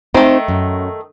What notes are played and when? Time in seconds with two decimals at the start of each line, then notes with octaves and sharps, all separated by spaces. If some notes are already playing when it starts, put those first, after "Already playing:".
0.14 D#3 A3 C4 D#4 C5
0.48 F#2